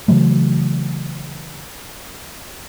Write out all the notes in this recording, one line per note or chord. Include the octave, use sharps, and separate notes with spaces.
C#3 E3 F#3 A3